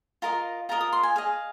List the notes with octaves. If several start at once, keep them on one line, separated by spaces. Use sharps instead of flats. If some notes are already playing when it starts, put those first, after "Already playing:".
F4 A#4 D#5 A#5
F4 A#4 D#5 A#5
D#6
C6
G#5
G#4 D#5 F5